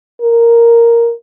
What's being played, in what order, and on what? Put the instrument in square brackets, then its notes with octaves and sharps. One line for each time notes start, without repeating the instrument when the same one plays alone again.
[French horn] A#4